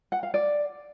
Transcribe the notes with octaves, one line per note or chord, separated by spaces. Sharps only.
F#5
F5
D5